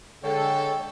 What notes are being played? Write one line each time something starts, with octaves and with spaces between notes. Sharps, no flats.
D3 G#3 A4 C#5 G5